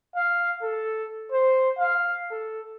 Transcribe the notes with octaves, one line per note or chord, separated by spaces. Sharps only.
F5
A4
C5
F5
A4